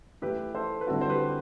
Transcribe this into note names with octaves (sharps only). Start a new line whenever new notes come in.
E3 A3 E4 G4 B4
A4 C5
B4
D3 G3 C4 E4 F#4 A4
C5
G4 B4